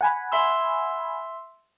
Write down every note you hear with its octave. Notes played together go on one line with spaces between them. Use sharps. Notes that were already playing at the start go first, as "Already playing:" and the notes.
F#5 G#5 B5
E5 C6 E6